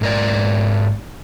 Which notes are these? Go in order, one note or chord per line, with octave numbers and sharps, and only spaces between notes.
G#2 A#4 D5